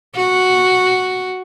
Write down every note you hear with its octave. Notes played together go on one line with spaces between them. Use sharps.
F#4